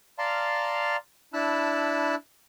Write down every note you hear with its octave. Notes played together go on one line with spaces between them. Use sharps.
D5 F5 A5 A#5 C6 F6
D4 E4 A5 B5 E6 F#6